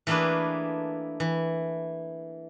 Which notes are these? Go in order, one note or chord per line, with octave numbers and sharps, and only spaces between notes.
E3 A3 A#3 D4 G#4 B4
E3